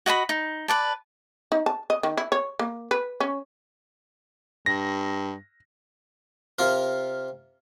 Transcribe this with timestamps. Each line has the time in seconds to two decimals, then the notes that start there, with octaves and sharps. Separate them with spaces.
0.06 F#4 D#5 A5 B5
0.29 D#4
0.68 B4 D5 A5
1.52 D#4
1.66 A5
1.90 D#5
2.03 D#3
2.17 E4
2.32 C#5
2.59 A#3
2.91 B4
3.20 C#4
4.66 G2 A#6
6.59 C3 F4 A#4